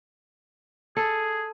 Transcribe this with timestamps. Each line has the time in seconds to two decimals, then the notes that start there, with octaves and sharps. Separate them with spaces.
0.97 G#4 A4